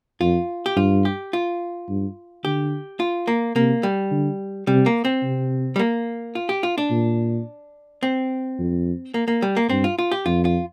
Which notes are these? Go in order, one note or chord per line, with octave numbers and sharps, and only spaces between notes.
F2 F4
G4
G2 F4
G4
F4
G2
D3 G4
F4
A#3
C3 A#3
G3
D3
C3 G3
A#3
C4
C3
G3
A#3
F4
G4
F4
D4
A#2
C4
F2
A#3
A#3
G3
A#3
G2 C4
F4
F4
G4
F2 F4
F4